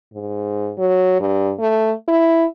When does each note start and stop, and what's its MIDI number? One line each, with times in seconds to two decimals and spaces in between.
0.14 0.73 44
0.78 1.18 54
1.20 1.52 43
1.59 1.93 57
2.08 2.45 64